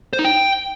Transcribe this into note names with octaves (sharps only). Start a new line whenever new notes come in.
C5
D#4
G5